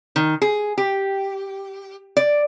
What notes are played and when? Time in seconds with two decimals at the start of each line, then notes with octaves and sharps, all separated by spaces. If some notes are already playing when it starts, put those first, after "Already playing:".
0.16 D#3
0.42 G#4
0.78 G4
2.17 D5